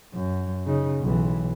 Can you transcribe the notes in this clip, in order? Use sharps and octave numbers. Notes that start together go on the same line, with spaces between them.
F#2
C#3 D#4
B1 E3